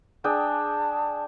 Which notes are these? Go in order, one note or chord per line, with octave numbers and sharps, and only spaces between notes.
D4 G#4 G5 A5